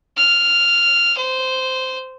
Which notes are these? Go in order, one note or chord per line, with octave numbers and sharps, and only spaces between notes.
F6
C5